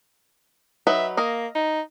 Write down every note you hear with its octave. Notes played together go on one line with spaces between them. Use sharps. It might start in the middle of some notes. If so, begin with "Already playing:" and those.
F#3 D#4 B4 E5
A#3 D#5 F5
D#4